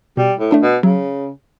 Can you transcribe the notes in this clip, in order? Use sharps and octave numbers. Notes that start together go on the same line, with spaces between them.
B2 G3
A2
A3 D4 A4
B2
C#3 F#3